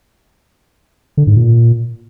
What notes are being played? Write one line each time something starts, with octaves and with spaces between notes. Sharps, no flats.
D3
G#2
A#2